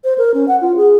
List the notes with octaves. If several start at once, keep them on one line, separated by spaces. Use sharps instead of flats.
C5
A#4
C#4
F#5
F4
G#4